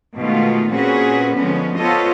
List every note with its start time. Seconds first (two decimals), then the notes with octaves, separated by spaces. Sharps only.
0.17 B2 D#3 G#3 A3 B3 F4
0.72 A#2 C4 C#4 F#4 G#4 B4
1.36 D3 F3 G#3 B3 C#4
1.80 B3 F4 A4 C5 C#5 D#5